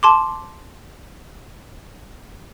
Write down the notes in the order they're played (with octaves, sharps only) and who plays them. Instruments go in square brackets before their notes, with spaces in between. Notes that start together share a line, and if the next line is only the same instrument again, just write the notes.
[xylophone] A5 C6 D6